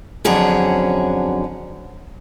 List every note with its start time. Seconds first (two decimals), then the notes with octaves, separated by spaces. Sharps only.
0.24 F2 D3 F#3 C#4 G#4